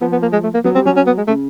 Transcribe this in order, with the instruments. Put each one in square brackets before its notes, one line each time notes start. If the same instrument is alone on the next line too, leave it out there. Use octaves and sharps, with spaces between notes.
[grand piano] F3 [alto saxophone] B3
[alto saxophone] B3
A#3
G#3
A3
A#3
[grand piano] F#3 [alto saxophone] B3
[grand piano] G3 [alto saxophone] C4
[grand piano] F#3 [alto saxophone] C#4
[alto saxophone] C#4
B3
G#3
[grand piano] C#3 [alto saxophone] A3